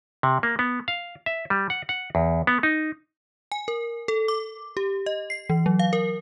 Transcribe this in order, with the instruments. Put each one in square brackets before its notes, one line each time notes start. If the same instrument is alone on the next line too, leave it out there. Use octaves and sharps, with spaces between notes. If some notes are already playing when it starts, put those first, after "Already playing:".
[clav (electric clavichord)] C3
A#3
B3
F5
E5
G3
F#5
F#5
E2
B3
D#4
[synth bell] G#5
A#4
A4
D6
G4
D#5
C7
E3
F#3
F5
A#4